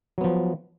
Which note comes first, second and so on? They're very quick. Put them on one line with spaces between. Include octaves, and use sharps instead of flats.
F#3 B3 F3